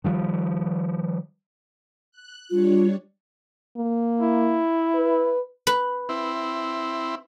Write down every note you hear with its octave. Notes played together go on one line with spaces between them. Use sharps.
D#3 F3 G3
F#6
G3 D4 F4 C#5
A#3
E4
B4
B4
C4 E4